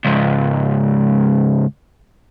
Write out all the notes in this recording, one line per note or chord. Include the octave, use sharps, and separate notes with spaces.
C#2 G#2